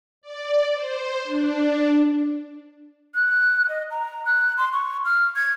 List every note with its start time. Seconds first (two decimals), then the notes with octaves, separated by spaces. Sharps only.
0.22 D5
0.73 C5
1.24 D4
3.14 F#6
3.69 D#5
3.91 A#5
4.25 F#6
4.57 C6
4.73 C#6
5.05 F6
5.36 G#6